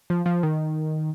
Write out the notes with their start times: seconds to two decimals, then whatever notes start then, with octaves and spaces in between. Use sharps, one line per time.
0.10 F3
0.26 F3
0.43 D#3